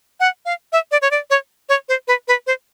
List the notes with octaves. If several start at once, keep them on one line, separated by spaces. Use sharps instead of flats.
F#5
F5
E5
D5
C#5
D5
C#5
C#5
C5
B4
B4
C5